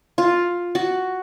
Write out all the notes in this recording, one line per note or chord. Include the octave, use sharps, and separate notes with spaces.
F4
F#4